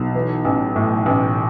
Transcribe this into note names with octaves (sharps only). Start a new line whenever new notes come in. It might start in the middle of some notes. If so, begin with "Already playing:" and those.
Already playing: B1
E3
A1
A2
A1